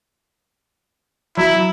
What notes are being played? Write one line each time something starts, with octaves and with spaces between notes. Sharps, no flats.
F#3 E4